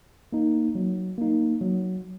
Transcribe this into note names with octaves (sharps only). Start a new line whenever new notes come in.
A#3 D#4
F#3
A#3 D#4
F#3